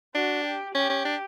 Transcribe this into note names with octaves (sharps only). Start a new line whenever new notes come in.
D4 F#4
G4
C#4 G4
C#4
D4